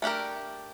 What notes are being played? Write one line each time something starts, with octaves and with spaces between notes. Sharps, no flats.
A3 D4 G4 A#4